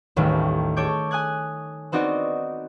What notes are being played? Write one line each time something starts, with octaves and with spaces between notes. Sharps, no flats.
A1 D#2 A2 D#3 G3
A4 C#5 D6 G6 G#6 D7
G#5 D#6 F#6 G#6
B3 C4 D#4 F#4 D5 D#5